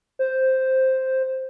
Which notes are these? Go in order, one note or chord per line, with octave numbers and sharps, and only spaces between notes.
C5